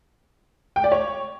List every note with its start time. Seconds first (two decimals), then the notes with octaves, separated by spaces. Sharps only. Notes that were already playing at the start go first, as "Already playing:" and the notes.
0.76 G5
0.84 D5
0.92 C#5